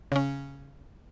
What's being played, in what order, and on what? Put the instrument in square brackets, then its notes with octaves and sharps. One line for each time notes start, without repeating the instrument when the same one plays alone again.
[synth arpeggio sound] C#3 C#4